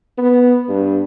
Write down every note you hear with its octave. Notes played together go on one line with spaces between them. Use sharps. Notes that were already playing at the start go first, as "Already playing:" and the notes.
B3
G2